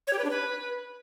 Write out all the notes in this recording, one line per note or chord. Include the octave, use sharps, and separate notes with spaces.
C#5
G4
B4
D4
B4